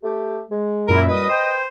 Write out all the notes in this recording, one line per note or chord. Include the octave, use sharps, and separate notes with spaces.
A3 G4
G#3
F#2 A#2 E4 A#4
F#2 G3 B4 D#5 D#6
B4 C5 G5